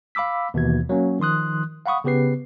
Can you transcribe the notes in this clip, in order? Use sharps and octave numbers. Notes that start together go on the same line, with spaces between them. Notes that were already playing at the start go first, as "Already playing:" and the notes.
F5 B5 D6 E6 B6
D#2 B2 E3 G#6
F#3 A#3 C#4
D#3 F3 C6 D#6 F#6
F5 F#5 B5 C#6 D#6
C#3 B3 G4 B4 C7